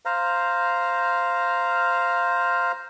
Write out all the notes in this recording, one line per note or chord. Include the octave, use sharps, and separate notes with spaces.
C5 F5 A#5